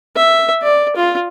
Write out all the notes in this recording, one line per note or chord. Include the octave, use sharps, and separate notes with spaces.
E5
D5
F4